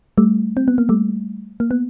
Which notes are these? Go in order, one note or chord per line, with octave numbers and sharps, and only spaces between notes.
G3 A3
C4
B3
A#3
G3 A3
A#3
B3